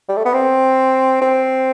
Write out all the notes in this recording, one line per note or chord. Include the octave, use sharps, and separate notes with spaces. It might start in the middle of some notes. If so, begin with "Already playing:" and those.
G3
A3
B3
C4
C4